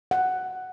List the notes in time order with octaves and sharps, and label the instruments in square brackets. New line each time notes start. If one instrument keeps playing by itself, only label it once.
[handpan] F#5